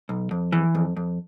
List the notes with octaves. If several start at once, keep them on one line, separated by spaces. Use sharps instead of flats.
B1
F2
E3
F2
F2